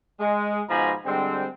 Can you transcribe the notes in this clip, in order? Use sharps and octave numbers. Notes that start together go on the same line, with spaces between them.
G#3
G#2 B2 F3 G#5 A#5 B5
D3 G3 G#3 C4